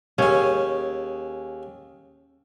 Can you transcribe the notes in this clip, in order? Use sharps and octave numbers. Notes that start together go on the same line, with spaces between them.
D#2 C#4 G#4